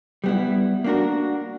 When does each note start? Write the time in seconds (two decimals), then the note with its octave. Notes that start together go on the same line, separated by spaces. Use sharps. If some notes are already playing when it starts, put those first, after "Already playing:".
0.24 G3 B3 E4
0.84 A#3 D4 F#4 A#4